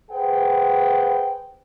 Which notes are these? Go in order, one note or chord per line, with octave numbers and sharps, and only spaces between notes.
G#4 B4 C5 F#5 G5